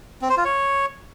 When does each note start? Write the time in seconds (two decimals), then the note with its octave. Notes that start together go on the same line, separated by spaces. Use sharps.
0.22 C4
0.29 C5
0.37 F4
0.45 C#5